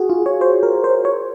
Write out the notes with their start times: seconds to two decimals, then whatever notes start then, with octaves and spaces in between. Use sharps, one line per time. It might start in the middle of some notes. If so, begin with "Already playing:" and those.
Already playing: F#4 G#4
0.10 F4
0.26 C#5
0.41 C5
0.63 A#4
0.84 C5
1.05 C#5